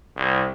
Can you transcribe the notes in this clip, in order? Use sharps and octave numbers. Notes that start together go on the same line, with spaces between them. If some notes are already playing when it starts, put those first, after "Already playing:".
C2